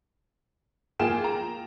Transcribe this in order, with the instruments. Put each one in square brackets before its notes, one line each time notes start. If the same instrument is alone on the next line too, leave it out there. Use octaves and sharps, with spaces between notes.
[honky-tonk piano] A#3 F4 G#4 G5 E7
A#5